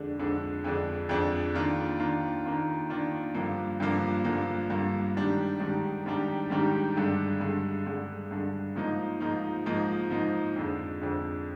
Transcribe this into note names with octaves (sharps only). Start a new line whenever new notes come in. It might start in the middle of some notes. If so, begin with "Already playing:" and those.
Already playing: F2 D3 G#3 D4
F2 D3 G#3 D4
F2 D3 G#3 D4
F2 D3 G#3 D4
D#3 A#3 D4 F4
D#3 A#3 D4 F4
D#3 A#3 D4 F4
D#3 A#3 D4 F4
G2 D3 F3 A#3
G2 D3 F3 A#3
G2 D3 F3 A#3
G2 D3 F3 A#3
G#2 D#3 G3 D4 G4
G#2 D#3 G3 D4 G4
G#2 D#3 G3 D4 G4
G#2 D#3 G3 D4 G4
G2 D3 G#3
G2 D3 G#3
G2 D3 G#3
G2 D3 G#3
G#2 F3 A#3 D#4
G#2 F3 A#3 D#4
G#2 F3 A#3 D#4
G#2 F3 A#3 D#4
F2 D3 G#3
F2 D3 G#3